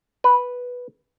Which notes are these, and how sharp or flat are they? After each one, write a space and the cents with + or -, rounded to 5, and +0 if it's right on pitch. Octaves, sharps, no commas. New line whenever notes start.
B4 -5